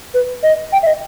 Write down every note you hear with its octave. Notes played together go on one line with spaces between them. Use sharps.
B4
D#5
G5
E5
D#5